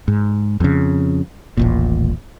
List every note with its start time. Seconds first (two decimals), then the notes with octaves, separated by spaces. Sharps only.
0.08 G#2
0.60 F2 C#3
1.57 D#1 A1 A#2